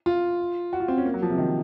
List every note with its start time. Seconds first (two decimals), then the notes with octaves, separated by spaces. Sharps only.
0.06 F4
0.73 F#4
0.80 F4
0.88 C4
0.98 C#4
1.05 A#3
1.14 F#3
1.22 F3
1.30 C3
1.38 D#3